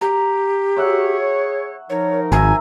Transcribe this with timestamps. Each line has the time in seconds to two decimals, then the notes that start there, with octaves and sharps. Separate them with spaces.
0.01 G4 A#5
0.77 F#4 G#4 C#5 E5 F#5
1.90 F3 D#4 A#4 C#5
2.32 G#1 E5 G#5 A#5